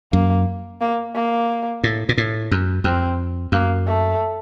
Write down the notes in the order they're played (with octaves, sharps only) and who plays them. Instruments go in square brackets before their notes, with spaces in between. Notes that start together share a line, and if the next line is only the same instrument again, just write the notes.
[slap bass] F#2 [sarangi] A#3
[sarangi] A#3
A#3
[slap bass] A2
A#2
A2
F#2
[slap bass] F2 [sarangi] C4
[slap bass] F#2 [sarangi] A#3
[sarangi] A3